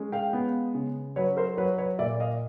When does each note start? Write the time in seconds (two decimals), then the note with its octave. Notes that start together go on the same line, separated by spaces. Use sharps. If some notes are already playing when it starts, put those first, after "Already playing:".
Already playing: G#3 C#4
0.12 F5 G5
0.33 B3
0.74 C#3
1.16 F#3 B4 C#5
1.36 A#4 C5
1.57 F#3 B4 C#5
1.78 B4 C#5
1.99 A#2 D5 E5
2.20 D#5 F5